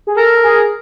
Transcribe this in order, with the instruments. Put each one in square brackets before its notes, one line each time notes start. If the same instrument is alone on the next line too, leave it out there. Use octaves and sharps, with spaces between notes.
[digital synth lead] G#4
[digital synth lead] A4 [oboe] A#4
[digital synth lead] G#4